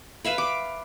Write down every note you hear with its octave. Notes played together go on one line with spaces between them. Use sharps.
B4 E5 F5 B5
D6